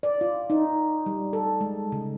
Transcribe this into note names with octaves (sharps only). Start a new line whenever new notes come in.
D5
F4
D#4
G3
A4
G#3
C#3